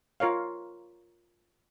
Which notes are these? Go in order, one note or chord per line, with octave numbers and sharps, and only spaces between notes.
F4 A#4 C#5 F5